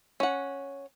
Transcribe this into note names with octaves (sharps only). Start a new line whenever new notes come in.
C#4 F#5